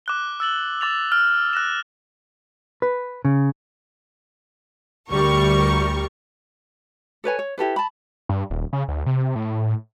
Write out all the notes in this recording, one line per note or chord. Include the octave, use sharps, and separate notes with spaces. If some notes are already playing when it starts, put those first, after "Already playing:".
D6 F#6 G7
E6 A6 F#7 G7
D6 A6 F7
F6
F#6 A#6 E7
B4
C#3
D2 G3 A#4 C#6
A4 B4 C#5 G#5
C#5
E4 G4 A4 B4
A5 B5
G2
D#1
C#3
D2
C3
A2